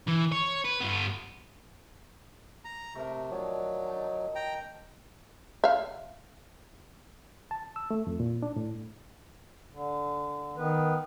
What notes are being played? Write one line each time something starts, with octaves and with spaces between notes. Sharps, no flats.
E3
C#5
B4
G2 B3
A#5
C3 A3 A#4
D#3 F3 F#3 D4
D#4 A5
G5 A#5
E5 F5
A5
E6
A3
F2
A#2
D4
A2
D3
D#3 B3 B4